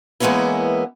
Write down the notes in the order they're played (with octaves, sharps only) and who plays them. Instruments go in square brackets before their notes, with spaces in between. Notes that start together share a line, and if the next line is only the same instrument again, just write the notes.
[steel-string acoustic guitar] E3 G#3 A#3 B3 C#4 E4